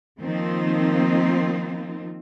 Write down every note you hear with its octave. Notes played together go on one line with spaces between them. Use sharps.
D#3 F3 A#3 C4 D#4 F4